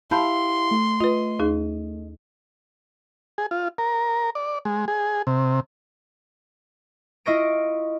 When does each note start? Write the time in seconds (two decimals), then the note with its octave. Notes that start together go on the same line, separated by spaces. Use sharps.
0.11 E4 G4 F5 A5 B5 C6 G6
0.71 A3
1.00 F4 B4 D#5
1.39 D#2 D#4 G#4
3.38 G#4
3.51 F4
3.78 A#4
4.35 D5
4.65 G#3
4.88 G#4
5.27 C3
7.26 E4 F4 D#5 C#6 A#6 D7